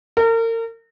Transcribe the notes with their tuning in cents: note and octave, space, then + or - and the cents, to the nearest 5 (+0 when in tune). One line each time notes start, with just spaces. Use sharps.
A#4 -35